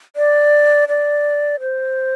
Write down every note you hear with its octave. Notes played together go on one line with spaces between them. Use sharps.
D5
D5
C5